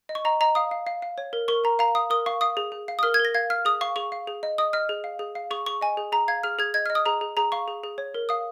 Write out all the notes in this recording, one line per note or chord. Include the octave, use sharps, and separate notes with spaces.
D#5
C#6
D#5 A#5
D#5 A#5
F5 D#6
F5
F5
F5
C#5
A#4
A#4 C#6
A#4 A#5
F5 A#5
F5 D#6
A#4 D#6
F5 C#6
F5 D#6
G#4
G#4
F5
D#6
A#4 F6
G#6
A#4
A#6
F5 G#6
F5 F6
G#4 D#6
F5 C#6
G#4 C#6
F5
G#4
D#5
D#5 D#6
D#5 F6
G#4
F5
G#4
F5
G#4 C#6
G#4 C#6
D#5 G#5
G#4
G#4 A#5
F5 G#6
G#4 F6
G#4 G#6
D#5 G#6
D#5 F6
D#6
G#4 A#5
G#4
G#4 A#5
F5 C#6
G#4
G#4
C#5
A#4
F5 D#6